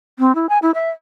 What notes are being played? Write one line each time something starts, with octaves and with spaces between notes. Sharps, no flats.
C4
E4
G#5
E4
E5